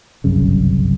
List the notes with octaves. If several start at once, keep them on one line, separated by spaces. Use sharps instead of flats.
G1 C2 F#2 C#3